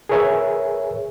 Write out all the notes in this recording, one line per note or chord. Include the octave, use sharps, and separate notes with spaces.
G#4 A#4 B4 C#5 E5 G#5